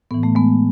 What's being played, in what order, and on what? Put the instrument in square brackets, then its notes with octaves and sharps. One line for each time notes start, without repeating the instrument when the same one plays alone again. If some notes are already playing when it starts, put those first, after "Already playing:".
[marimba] A2 E3 B3
A3
G#3 B3